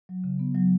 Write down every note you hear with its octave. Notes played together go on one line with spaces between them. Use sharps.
F#3
C#3
B3
F#3